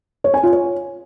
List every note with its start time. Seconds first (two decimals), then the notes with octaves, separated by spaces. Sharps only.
0.24 C#5
0.34 G#5
0.43 F4
0.53 C#5